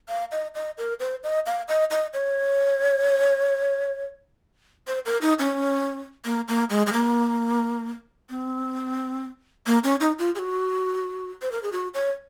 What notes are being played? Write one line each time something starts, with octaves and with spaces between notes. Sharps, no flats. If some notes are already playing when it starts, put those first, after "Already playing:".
F5
D#5
D#5
A#4
C5
D#5
F5
D#5
D#5
C#5
C5
A#4
D#4
C#4
A#3
A#3
G#3
G#3
A#3
C4
A#3
C#4
D#4
F4
G#4
F#4
C5
A#4
G#4
F#4
C#5